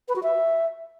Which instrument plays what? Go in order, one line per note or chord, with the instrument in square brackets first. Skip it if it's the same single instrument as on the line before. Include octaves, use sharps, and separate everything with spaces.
[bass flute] B4
F#4
E5